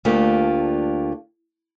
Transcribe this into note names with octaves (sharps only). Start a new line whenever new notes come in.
D2 A3 A#3 D4 F4 G4